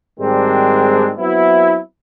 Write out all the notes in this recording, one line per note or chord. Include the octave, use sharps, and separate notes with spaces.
G#2 D#3 G3 G#3 C4 D4
F#3 B3 C4 E4